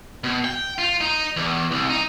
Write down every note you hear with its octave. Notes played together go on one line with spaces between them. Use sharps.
B2
G5
F4
D#4
E2
C2
D#4